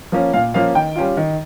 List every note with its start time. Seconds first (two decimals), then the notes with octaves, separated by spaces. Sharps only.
0.12 F3 A#3 C#4
0.33 A#2 F5
0.54 F3 A#3 C#4 F5
0.75 D#3 G5
0.96 G3 C#4 F4
1.17 D#3